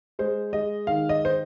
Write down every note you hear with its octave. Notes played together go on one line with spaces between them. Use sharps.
G#3 C5
G#3 D#5
D#3 F5
D#5
C5